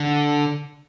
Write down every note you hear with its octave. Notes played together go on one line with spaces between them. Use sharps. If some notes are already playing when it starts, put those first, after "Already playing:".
Already playing: D3